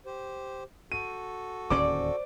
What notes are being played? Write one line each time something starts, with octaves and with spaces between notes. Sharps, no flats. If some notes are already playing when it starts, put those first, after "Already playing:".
G4 C5
F#4 A4 D#7
D1 D#2 C#4 C5 D5 D6